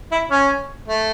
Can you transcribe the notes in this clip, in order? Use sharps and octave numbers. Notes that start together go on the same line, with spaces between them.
E4
C#4
A3